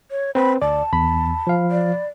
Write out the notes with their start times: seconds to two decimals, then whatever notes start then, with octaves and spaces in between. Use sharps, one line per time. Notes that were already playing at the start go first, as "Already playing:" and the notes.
0.11 C#5
0.35 C4 B4 B5
0.62 D2 D5 A5
0.93 E2 B5
1.47 F3 F5
1.71 D5